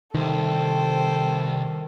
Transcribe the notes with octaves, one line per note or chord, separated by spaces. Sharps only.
C2 D#3 A4 C5 G5